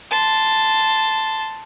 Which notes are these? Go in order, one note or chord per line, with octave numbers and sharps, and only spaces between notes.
A5 C6